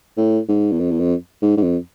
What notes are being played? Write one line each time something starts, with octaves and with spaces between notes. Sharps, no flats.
A2
G#2
E2
F2
E2
F2
G#2
G#2
F2